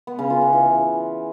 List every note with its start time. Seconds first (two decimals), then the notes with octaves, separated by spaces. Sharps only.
0.07 B3
0.19 C#3
0.30 F4
0.41 B3
0.53 E3